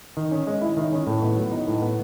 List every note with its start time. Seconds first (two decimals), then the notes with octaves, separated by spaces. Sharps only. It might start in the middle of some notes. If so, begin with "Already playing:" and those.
0.17 D#3
0.31 C#4
0.47 G#3
0.62 E4
0.77 D#3
0.92 C#4
1.07 A2
1.22 B3
1.37 F#3
1.52 D#4
1.68 A2
1.82 B3